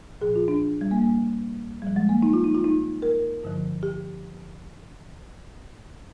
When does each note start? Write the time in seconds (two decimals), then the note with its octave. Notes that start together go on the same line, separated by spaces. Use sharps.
0.21 A#2 F3 G#4
0.36 F4
0.48 D4
0.81 G3
0.91 A#3
1.02 A#3
1.82 A#2 F3 G3
1.96 G#3
2.09 A#3
2.23 D#4
2.33 F4
2.44 D#4
2.55 F4
2.64 D#4
3.02 A#4
3.44 G2 D3 F3
3.83 G4